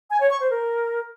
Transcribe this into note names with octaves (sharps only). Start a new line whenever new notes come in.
G#5
C#5
C#6
C5
A#4